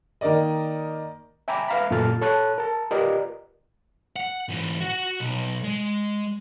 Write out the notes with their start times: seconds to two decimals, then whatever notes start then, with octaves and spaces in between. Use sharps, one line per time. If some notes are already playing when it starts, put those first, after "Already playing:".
0.21 D#3 A#3 A#4 D5 D#5
1.48 E5 G5 G#5 A#5 B5 D6
1.68 B4 E5 F5 A#5 B5
1.91 F#2 A#2 F4 A4 F6 A6
2.22 A4 C#5 A5 F#6
2.58 A#4 A5
2.91 F4 G4 A#4 B4 D5 D#5
4.16 F#5
4.49 G#2 E3
4.80 F#4 F#5
5.20 B1
5.64 G#3